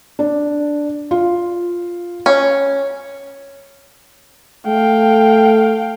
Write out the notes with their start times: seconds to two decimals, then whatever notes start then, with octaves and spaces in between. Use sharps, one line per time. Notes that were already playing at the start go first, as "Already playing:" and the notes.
0.19 D4
1.11 F4
2.26 C#4
4.67 A3 F5 G5